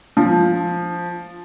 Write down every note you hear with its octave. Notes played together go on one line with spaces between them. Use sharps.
F3